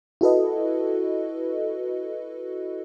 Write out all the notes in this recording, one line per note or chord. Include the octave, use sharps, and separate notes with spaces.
E4 F#4 A4 B4 D#5